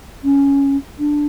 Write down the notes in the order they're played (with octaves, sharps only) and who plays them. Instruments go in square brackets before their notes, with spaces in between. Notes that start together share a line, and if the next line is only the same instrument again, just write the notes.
[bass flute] C#4
D4